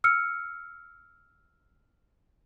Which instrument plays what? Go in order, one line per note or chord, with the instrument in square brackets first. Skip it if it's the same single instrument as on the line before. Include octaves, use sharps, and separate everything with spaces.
[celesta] E6 F6 C#7